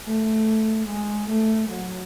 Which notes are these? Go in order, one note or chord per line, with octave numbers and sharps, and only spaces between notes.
A3
G#3
A3
F#3